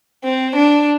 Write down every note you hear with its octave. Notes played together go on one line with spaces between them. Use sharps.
C4
D4